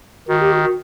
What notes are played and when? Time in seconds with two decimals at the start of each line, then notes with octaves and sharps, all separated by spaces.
0.28 D#3 F#4
0.40 G4
0.51 F#4
0.63 F#4